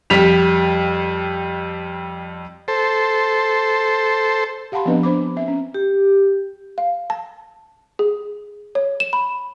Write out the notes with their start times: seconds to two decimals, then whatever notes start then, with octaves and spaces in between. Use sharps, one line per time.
0.10 F2 G3 B6 F7
2.68 A4 C5
4.72 G4 F5 F#5 A5 B5 C6
4.85 F3 B3 C4 D4 B4 D#5
5.03 D4 C5 B5 D6
5.36 C4 E5
5.48 C#4
5.74 G4
6.78 F5
7.10 A5
7.99 G#4
8.75 C#5
9.00 E7
9.13 B5